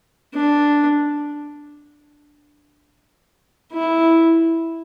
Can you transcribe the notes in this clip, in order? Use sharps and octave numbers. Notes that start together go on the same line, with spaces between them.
D4
E4